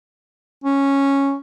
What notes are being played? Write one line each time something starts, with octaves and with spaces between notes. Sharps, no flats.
C#4